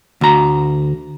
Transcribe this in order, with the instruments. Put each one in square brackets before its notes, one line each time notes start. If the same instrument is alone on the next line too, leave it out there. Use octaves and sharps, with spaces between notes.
[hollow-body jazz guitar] D2 A#5